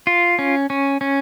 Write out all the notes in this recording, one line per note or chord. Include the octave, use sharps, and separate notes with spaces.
F4
C#4
C#4
C#4